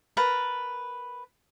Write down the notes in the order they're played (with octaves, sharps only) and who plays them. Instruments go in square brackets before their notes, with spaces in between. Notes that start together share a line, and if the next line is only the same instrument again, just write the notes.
[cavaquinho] A#4 B4 A5